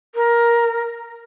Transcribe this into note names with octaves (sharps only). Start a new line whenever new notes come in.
A#4